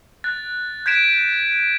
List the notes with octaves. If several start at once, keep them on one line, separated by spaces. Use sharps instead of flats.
F#6 A6
G6 G#6 B6 D7 E7